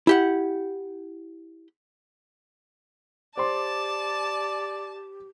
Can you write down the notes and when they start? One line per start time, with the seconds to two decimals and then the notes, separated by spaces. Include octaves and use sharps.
0.07 E4 G4 F#5
3.37 G4 C5 D5 A5 C6